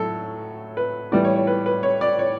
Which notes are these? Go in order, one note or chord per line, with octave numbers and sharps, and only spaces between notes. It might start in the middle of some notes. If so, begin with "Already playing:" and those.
Already playing: A2 F#3 A3 A4
B4
A2 E3 G3 B3 D5
C#5
C#5
B4
B4
C#5
D5
C#5